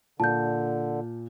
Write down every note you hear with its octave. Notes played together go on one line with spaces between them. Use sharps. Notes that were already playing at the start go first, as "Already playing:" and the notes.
A#2 D3 A5 G6